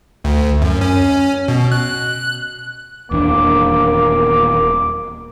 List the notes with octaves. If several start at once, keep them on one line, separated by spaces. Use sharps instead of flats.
D2
F#2
C#4
B2
F#6
D#1 E2 A#3 D4 D6